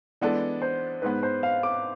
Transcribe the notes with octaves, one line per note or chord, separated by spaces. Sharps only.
E3 G#3 B3 D4 A4 D5
C5
G#2 G#3 B3 B4
C5
F5
D6